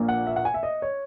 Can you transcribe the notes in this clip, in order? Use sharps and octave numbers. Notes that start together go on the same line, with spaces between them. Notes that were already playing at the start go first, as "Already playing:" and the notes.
Already playing: A#1 A#2 A#3
F#5
E5
F#5
G#5
E5
D#5
C#5